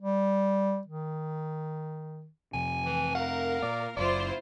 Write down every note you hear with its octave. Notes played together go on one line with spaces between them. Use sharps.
G3
D#3
F2 C3 G#5
E3
A#4 F5 F#5
A#2 D5
F#1 F#2 E4 F4 C5 D5